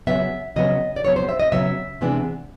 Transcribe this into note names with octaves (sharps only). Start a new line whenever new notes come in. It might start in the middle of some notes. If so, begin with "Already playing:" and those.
C#3 F#3 B3 E5
C#3 F#3 B3 D#5
D5
C#3 F#3 B3 C#5
C5
E5
D#5
C#3 F#3 B3 E5
C3 E3 G#3 B3 D4